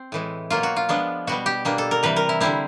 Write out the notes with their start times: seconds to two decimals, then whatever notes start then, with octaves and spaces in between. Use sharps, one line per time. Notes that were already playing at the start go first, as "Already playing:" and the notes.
Already playing: C4
0.12 A2 E3 G#3
0.50 B2 F#3 A#3 F4
0.63 F#4
0.76 F4
0.89 F3 G#3 B3 D4
1.27 B2 G3 B3 F#4
1.46 G4
1.65 B2 G3 A#3 D4
1.78 A4
1.91 A#4
2.03 C3 E3 G3 B4
2.16 A#4
2.29 E4
2.40 D3 G3 C4 E4